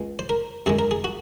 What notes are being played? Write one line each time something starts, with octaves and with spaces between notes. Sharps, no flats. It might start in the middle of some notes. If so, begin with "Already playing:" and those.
Already playing: C#2 G#3
C5
A#4
F#2 D#3 G#3 G#4
A#4
G#4
F#4